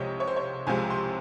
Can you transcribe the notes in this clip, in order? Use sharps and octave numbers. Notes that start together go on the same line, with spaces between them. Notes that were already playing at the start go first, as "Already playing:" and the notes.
Already playing: C2 C3 F3 G#3 C#5 D#5
C#5
C5
C#5
C2 C3 F3 G#3 G#5
C6